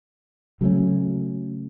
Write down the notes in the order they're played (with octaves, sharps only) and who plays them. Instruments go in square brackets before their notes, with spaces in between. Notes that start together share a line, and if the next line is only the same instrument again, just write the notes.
[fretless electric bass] C#3 F#3 A3 C#4